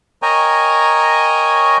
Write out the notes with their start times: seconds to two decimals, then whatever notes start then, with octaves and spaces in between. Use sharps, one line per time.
0.22 A#4 C#5 D#5 G5 G#5 A#5